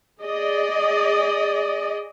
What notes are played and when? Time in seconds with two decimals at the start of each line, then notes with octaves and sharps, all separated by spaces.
0.21 G#4 D5 D#5